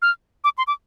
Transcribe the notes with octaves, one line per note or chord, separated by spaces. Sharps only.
F6
D6
C6
D6